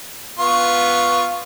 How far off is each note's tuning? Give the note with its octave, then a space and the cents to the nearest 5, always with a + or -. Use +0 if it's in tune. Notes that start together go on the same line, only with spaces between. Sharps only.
B3 -5 F4 +0 C#6 +0